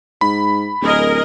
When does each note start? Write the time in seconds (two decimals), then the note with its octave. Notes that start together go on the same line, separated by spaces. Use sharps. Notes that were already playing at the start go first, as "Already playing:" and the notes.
0.21 G#2 B5
0.82 D1 G#4 A#4 D#5